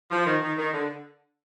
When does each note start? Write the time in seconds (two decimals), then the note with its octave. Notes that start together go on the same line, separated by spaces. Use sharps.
0.11 F3
0.26 D#3
0.42 D#3
0.58 D#3
0.73 D3